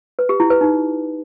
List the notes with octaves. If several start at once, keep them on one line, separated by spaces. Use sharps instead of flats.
B4
G4
E4
B4
D#4